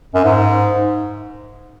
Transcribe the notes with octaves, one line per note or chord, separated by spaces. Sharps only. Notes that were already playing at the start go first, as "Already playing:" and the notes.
F#2
G#2